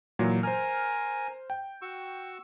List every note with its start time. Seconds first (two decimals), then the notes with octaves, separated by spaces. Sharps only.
0.19 A#2 E3 F#3
0.43 A#4 C5 G#5 F6
1.50 G5
1.82 F#4 C#6 E6